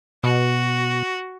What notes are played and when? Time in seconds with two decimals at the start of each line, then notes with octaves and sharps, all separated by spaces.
0.24 B2 F#4